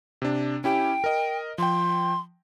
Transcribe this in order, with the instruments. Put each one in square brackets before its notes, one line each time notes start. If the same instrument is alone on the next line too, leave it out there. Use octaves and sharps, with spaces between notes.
[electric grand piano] C3 D4
[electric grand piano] C#4 E4 G4 [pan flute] G5
[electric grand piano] A#4 D#5
[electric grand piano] F3 G5 [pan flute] C6